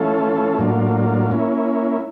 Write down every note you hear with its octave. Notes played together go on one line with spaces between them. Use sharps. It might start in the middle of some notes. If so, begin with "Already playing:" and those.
Already playing: E3 A3 C#4 F4 A4
A2 F#3 A#3 D4 F4
A#3 C#4 E4